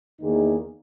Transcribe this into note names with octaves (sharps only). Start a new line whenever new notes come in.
E2 D#3 A#3 D#4 G#4